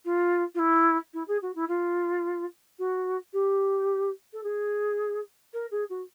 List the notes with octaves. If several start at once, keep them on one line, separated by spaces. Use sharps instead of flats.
F4
F4
E4
E4
G#4
F#4
E4
F4
F#4
G4
A4
G#4
A#4
G#4
F#4